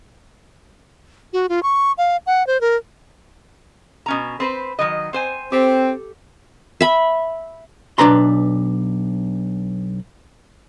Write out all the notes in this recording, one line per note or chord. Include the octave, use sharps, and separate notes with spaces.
F#4
F4
C#6
F5
F#5
C5
A#4
B2 C#4 A#5
C4 B4 C5
D#3 F#3 D#5
C4 C5 G#5
C4 G4 A4
E5 B5
B1 D4 B4 A#5 C6